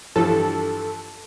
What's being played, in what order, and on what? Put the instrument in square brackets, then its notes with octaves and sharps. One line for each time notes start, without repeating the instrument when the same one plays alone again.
[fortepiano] G2 E3 F3 [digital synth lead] A4